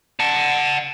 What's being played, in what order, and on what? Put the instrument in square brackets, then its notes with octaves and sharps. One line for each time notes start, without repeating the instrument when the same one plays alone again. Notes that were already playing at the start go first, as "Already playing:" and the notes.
[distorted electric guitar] F#5 A5